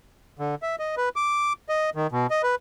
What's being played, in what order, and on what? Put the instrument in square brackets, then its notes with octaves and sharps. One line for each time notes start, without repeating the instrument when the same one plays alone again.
[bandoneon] D3
E5
D#5
B4
D6
D#5
D#3
B2
D#5
B4